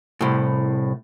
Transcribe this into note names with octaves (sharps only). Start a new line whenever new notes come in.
C2 A2